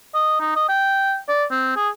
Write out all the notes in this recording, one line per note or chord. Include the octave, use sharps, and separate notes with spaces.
D#5
D#4
D#5
G5
D5
C4
G#4